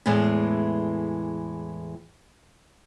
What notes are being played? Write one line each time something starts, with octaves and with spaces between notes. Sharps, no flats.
E2 A2 E3 G#3 A3